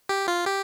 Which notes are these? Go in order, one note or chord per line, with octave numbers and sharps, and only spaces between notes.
G4
F4
G4